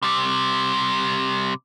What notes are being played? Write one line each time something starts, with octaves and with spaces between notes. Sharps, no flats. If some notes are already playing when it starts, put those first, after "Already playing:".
C3 G3